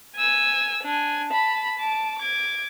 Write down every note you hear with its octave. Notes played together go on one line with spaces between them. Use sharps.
G#5 E6
D4 G#5
A5 B5
A5 D6
D6 G#6